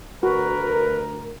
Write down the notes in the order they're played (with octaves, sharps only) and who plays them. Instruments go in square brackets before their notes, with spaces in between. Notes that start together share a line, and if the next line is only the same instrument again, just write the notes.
[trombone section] D2 A#4 [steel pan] F#4 [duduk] B4